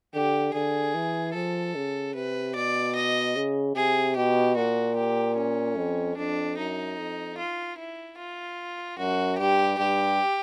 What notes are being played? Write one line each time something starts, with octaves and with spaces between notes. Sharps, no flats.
D3 G4
D3 G#4
E3
F3 A4
C#3
C3 B4
B2 D5
D#5
C#3
C3 G#4
B2 G4
A#2 F#4
G4
C#4
F2
F2 D4
F#2 D#4
F2
F4
E4
F4
F#2 F#4
G2 G4
G2 G4